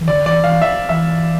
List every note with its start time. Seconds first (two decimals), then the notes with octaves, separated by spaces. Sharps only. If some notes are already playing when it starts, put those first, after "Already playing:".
0.01 E3
0.08 D3 D5
0.26 E3 D5
0.44 E3 F5
0.62 F3 E5
0.89 E3 E5